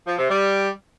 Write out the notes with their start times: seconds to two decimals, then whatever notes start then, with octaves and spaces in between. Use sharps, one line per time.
0.06 F3
0.18 C3
0.29 G3